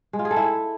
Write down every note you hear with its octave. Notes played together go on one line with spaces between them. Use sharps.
G#3
F4
G#4
A4
E4